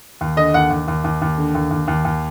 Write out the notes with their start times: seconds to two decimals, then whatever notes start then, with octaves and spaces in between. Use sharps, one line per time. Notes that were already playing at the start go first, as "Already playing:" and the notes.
0.21 D#2
0.37 D3 D#5
0.54 D#2 F#5
0.70 D#2
0.88 D#2
1.04 D#2
1.22 D#2
1.38 D3
1.55 D#2
1.71 D#2
1.88 D#2
2.05 D#2